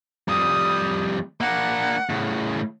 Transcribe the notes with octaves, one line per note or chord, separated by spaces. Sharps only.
F2 G3 D#6
A#3 D4 F#5
A2 C#3